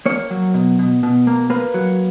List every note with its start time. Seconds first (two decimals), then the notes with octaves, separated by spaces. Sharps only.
0.06 A#3 C#5
0.31 F#3
0.54 B2
0.79 B2
1.03 B2
1.27 A#3
1.50 A#3 B4
1.74 F#3